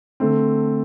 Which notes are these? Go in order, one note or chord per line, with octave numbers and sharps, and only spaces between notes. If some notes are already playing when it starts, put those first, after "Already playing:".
D3 A3 C4